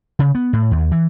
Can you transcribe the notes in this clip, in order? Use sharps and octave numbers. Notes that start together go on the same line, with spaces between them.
C#3
B3
A2
D#2
E3